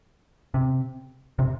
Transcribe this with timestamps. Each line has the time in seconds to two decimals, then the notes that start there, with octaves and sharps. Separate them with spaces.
0.54 C3
1.39 C3